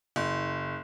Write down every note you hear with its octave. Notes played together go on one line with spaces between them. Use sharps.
F#1